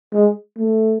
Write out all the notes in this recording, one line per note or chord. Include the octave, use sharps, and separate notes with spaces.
G#3
A3